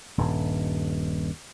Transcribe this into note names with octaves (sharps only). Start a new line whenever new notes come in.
D#1 G2